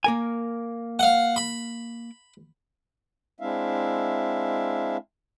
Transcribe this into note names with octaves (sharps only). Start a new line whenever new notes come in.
A#3 A#4 G#5
F5 F#5
B5
G#3 C4 D4 E4 E5 F5